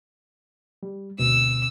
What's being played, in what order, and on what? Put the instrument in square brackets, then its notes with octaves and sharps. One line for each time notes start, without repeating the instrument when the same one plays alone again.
[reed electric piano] G3
[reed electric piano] D2 B2 C4 [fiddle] E6